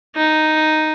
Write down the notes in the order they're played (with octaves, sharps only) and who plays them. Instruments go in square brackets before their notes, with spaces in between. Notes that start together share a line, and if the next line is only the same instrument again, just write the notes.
[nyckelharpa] D#4